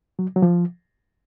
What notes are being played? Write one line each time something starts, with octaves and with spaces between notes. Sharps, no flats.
F#3
F#3
F3